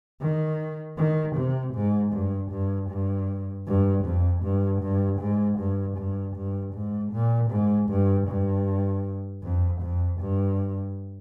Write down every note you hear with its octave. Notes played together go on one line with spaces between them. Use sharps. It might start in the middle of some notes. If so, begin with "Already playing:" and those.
D#3
D#3
C3
G#2
G2
G2
G2
G2
F2
G2
G2
G#2
G2
G2
G2
G#2
A#2
G#2
G2
G2
F2
F2
G2